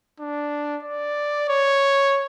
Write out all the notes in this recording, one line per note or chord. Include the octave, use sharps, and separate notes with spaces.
D4
D5
C#5